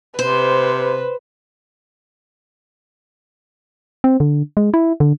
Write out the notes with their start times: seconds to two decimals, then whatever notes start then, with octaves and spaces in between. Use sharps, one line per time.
0.19 C3 B4 C5
4.04 C4
4.20 D3
4.57 G#3
4.74 E4
5.00 D3